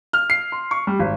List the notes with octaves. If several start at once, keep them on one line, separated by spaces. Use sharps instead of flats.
F6
C7
C6
C#6
G3
G#1